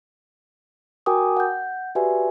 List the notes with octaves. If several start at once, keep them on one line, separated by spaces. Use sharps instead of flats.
F#4 A#4 G5 G#5 D6 D#6
F#5 G6
F#4 G4 B4 D5 E5 G#5